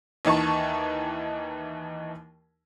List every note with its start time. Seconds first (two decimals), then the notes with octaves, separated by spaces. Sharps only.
0.25 D#2 E3 D#4 A5 C#6